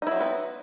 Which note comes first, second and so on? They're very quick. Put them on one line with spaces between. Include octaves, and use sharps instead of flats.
D#4 E4 F#3 C4 B3